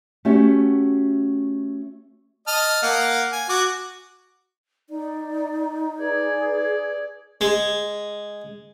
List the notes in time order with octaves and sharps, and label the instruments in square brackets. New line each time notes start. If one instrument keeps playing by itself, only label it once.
[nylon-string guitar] A3 C#4 F#4 G4 E5
[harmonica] D#5 A5 F6
A#3 F5 F#5
G#5
F#4 D6
[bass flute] D#4 [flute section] D5
[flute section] G#4 B4 G#6 [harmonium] D5
[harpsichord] G#3